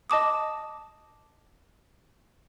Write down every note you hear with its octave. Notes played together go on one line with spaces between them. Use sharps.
D#5 A5 D6 D#6